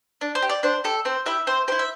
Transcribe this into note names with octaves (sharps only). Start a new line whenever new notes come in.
D4
C5
G4
D5
D4 C5
G4 A4
C4 C5
E4 G4 E5
C4 C5
E4 G4 C5
E5